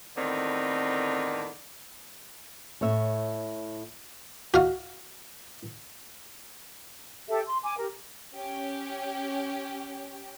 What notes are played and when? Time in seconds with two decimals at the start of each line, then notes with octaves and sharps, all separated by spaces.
0.17 E2 A2 D3 D#3 C4
2.81 A2 C#5 E5
4.54 F#4 F5
7.28 G4 A4 E5
7.46 C6
7.64 G#5 D6
7.78 G4 A#4
8.35 C#4 G4